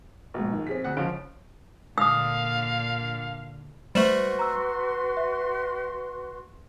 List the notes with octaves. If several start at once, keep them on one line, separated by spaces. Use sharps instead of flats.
A#1 G#2 B2
D#3
C4 G#4 B6
D2 F#5
C#3 F3 G#3 F5 D7
A#2 D3 F5 D#6 E6
G3 A3 F#4 B4 C5 C6 E7 F#7
A#5 E6
E5